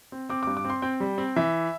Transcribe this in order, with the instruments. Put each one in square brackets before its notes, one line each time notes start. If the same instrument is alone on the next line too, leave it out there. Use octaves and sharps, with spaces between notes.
[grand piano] C4
C4 D6
G2 D6
D6
C4
C6
C4 G5
G3
C4
E3 E5